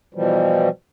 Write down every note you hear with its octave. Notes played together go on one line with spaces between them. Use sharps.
B2 E3 F3 G3